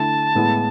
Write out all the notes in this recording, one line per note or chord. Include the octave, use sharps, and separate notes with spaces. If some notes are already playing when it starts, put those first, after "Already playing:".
Already playing: D3 A3 E4 A5
A2 G#3 B3 E4